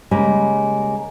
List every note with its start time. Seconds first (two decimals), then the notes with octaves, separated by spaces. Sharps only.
0.11 C#3 G3 G#3 A#3